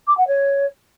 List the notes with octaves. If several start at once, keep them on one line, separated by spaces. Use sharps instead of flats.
D6
F#5
C#5